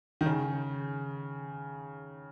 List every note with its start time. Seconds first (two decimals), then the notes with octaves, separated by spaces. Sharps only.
0.21 D#3
0.26 C#3